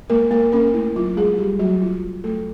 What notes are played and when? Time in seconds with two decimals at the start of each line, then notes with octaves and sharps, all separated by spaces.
0.10 G#3 A#3 A#4
0.31 G#3 A#3 A#4
0.52 A#3 C#4 A#4
0.74 A3 E4
0.96 F#3 F4
1.17 G#3 A3 G#4
1.38 G3 A3 G4
1.59 F#3 A3 F#4
1.81 F#3 F4
2.03 F#3
2.24 F#3 A3 A4